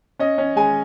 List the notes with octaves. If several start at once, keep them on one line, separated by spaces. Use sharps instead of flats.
C#4 D#5
C#4
G#3 G#5